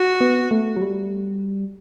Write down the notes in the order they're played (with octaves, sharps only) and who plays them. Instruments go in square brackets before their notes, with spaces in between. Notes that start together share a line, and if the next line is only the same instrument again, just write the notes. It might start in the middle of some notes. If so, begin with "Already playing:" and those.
Already playing: [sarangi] F#4
[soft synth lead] B3
A3
F#3
G3